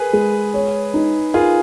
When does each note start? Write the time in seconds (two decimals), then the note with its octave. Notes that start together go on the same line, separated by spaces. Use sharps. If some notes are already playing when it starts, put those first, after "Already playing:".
Already playing: G#4 A#4 B4
0.13 G#3
0.54 C#5
0.94 D#4
1.34 F4 G#4 A#4